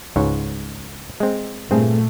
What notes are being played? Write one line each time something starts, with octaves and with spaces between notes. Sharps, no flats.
C#2 G#2 C#5
G#3 C4
G2 A#2 A3 A#3 C4 G#4